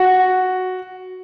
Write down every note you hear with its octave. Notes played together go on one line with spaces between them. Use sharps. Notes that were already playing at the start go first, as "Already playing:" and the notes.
Already playing: F#4